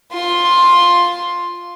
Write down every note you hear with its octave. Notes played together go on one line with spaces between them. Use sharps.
F4 C6